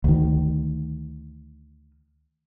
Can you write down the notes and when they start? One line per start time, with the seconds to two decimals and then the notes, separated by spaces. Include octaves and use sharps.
0.04 D2 D#3